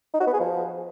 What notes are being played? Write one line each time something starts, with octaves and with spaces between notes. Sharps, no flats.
D#4
F#4
B3
G#4
F3